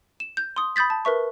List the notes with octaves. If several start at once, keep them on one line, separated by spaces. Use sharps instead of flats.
E7
G6
C6 D#6
B5 D#6 G6 A6 B6
A5
A#4 B4 E5 C#6